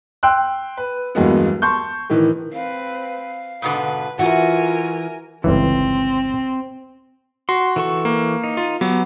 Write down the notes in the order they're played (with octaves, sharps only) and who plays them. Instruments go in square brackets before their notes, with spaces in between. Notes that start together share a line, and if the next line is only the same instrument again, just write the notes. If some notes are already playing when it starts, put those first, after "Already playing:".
[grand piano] G5 C6 E6 F#6
B4
E2 G2 F#3 G#3 A#3 B3
A5 C6 C#6 G6
A2 D#3 E3
[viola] C4 B4 [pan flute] F5
[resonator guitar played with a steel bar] G#2 B2 D3 [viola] B4
[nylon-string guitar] E3 [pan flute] F4 [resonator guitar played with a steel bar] F#4 [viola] A#4 G#5
[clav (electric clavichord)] G1 C#2 E3 [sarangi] C4
[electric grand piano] F#4 [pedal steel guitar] C6
[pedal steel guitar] E3 A4 C#6
[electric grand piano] A#3
[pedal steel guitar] D#4
[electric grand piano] F4
[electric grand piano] F#3 [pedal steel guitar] B3 G4